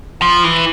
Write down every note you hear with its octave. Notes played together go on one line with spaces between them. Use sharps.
F3
E3